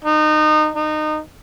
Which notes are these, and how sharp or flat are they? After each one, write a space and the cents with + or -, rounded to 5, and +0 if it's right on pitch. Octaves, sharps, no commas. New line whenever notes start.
D#4 -25
D#4 -25